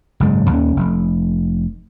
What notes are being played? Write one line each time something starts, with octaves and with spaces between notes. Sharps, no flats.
F#1 G#2 G#3
D#2 C#4
F1